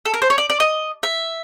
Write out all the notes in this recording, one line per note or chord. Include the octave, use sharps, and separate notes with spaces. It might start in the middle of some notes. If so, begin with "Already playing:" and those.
A4
A#4
C5
C#5
D5
D5
D#5
E5